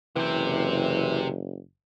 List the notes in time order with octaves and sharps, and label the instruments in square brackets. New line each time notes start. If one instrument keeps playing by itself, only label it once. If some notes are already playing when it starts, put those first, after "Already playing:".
[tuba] F#1 [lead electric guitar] C3 C4 [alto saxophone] E3